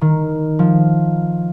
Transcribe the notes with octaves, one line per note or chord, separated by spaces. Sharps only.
D#3
F3